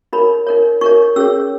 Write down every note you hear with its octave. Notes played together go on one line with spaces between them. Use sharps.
D#4 A#4 C#5 B5
D#4 A#4 C#5
D#4 A#4 C#5 C#6
C#4 G#4 C#5 E6